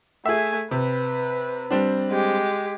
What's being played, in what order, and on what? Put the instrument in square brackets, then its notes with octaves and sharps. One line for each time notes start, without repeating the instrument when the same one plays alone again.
[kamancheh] A3 G#5 [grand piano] G#4 E5
[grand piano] C3 [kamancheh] B4
[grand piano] G3 C4 D4
[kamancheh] G#3 G4